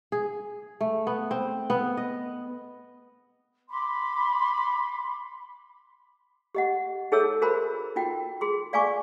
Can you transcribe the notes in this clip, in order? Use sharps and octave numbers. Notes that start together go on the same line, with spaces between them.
G#4
A3
B3
C4
B3
D#5
B5 C6 D6
G4 D#5 F#5
D#4 G#4 A4 C#5 E5 E6
F#4 A#4 C5 A5 B5
D#4 F4 F#4 G5
G#4 C6
D5 F5 G#5 A5 C#6 D6